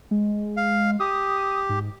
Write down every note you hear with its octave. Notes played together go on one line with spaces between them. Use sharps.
G#3
F5
G4 D#6
G#2